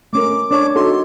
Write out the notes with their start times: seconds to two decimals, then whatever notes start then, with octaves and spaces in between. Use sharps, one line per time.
0.13 A3 C#4 A#4 D6
0.51 D4 C#5 A5 D6
0.76 D#4 F#4 A4 C6